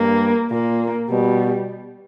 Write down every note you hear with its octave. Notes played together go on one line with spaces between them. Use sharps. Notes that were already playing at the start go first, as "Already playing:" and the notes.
Already playing: G2 A#3
A#2 A#3
B2 G3